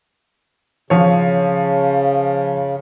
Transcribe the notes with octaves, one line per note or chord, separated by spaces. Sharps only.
C#3 F3 C#5